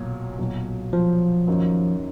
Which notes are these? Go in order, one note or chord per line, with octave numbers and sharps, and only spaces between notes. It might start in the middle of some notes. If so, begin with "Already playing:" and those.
Already playing: B1 A#2 F#3
B1 A#2 F#3
F3
F#2 D#3 A#3 D#4